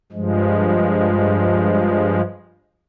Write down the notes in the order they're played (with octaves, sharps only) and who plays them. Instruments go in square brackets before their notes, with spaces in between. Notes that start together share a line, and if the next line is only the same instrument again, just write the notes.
[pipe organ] G2 F3 G#3